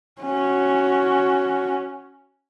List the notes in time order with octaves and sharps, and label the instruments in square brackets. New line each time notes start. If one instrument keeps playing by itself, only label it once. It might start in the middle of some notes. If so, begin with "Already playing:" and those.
[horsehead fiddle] C#4 F#4